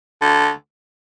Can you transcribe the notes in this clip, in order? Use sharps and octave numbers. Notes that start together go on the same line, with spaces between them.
D3